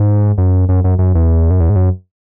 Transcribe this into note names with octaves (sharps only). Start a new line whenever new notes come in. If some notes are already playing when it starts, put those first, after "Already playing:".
Already playing: G#2
F#2
F#2
F#2
F#2
E2
F#2
E2
G#2
F#2